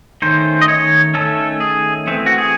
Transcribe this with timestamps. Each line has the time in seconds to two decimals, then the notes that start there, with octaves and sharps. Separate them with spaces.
0.22 D#3 A3 C#4 C5
0.62 D#5
0.68 C#5
1.14 D#3 A3 C#4 A4
1.60 G#4
2.07 E3 A3 C4
2.26 F#4
2.38 G#4